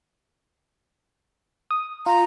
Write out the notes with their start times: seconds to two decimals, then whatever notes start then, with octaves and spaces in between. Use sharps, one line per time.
1.71 D#6
2.06 F4 A#5